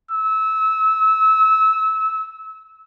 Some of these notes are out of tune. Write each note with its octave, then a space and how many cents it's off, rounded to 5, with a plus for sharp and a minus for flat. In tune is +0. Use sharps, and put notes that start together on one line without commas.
E6 -25